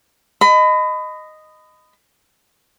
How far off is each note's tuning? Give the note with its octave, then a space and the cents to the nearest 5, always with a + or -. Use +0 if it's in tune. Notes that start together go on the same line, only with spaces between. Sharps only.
D#5 -5 B5 +30